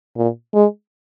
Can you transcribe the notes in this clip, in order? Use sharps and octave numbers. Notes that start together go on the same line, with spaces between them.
A#2
G#3